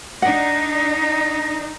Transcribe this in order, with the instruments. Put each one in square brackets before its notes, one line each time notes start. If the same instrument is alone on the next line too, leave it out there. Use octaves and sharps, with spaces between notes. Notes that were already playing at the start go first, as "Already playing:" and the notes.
[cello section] D4 D#4 [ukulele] F#5 [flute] A#6